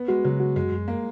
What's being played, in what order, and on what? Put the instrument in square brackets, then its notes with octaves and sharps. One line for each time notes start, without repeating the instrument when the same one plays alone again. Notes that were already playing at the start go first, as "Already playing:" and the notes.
Already playing: [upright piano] B3
[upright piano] G#3 [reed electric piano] F#4
[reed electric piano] C#3 [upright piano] F#3
[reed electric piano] F#4
[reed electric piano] F#2 [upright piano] G#3
[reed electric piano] F#2
[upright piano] A#3